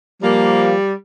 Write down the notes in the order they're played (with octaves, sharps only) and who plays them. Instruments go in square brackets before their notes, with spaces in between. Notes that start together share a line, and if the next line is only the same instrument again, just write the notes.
[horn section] F3 A#3 [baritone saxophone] G3